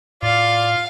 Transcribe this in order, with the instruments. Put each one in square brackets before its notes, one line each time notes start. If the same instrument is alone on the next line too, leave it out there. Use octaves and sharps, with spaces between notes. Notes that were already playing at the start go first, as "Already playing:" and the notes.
[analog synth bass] A2 [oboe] F4 [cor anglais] D5 [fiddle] F5